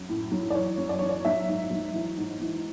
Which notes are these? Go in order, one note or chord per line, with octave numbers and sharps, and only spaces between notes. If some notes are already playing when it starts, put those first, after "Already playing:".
Already playing: F#2 F#3
A2
F#3
D5
E3 C#5
F#2
D5
E3 C#5
D5
F#3 E5
G#2
F#3
E3
G#2
E3